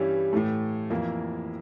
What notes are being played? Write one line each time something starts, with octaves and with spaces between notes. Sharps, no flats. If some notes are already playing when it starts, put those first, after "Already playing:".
Already playing: G2 E3 G3 C#4 E4
A2 E3 A3
F2 E3 A#3 E4